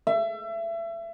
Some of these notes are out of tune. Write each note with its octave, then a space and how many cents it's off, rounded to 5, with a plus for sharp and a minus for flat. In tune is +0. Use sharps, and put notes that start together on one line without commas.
E5 +30